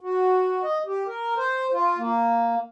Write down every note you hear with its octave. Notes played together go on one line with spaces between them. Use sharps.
F#4
D#5
G4
A#4
C5
F4
A#3